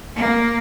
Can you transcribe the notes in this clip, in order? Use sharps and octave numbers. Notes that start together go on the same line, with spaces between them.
A#3